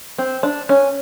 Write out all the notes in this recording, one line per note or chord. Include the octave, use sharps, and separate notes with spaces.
C4
D4
C#4